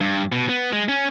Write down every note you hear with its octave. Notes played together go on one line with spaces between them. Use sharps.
G2
B2
B3
G#3
C#4